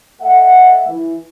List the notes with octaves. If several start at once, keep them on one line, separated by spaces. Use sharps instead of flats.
A3 A4 D#5 E5 F#5
E3